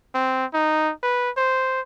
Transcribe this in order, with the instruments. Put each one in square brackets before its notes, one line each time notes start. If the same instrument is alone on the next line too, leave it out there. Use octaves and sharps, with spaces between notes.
[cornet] C4
D#4
B4
C5